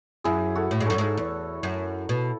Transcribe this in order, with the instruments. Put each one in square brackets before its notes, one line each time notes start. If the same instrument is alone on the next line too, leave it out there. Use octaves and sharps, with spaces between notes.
[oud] F#2 [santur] E4 G#4
[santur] F#4 A4
[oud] A2
G#2
[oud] F#2 [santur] A4 C#5
[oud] G#2
E2
F#2
B2